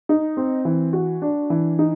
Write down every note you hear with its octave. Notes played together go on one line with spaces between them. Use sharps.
D#4
C4
E3
F#4
D4
E3
D#4